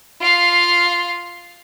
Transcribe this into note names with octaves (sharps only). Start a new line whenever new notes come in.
F4 F5